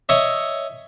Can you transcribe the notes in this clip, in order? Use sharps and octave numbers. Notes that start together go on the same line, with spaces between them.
C#5 D#5 E5